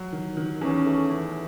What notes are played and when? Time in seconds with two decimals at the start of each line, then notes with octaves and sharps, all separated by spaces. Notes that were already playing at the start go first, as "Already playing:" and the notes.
Already playing: F#3
0.13 D#3
0.37 D#3
0.61 E2 C#4
0.86 A3
1.10 E2